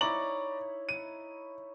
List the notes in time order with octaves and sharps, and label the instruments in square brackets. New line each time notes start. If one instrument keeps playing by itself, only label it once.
[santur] D#4 E4 C#5 [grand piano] D5 A#5 F#7
[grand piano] D#7